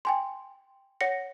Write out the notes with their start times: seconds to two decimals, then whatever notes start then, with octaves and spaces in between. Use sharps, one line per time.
0.05 G5 G#5 C6
1.01 C#5 F#5 A#6 C#7